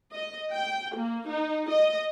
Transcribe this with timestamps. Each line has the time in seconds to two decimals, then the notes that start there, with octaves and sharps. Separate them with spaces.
0.12 D#5
0.52 G5
0.95 A#3
1.29 D#4
1.71 D#5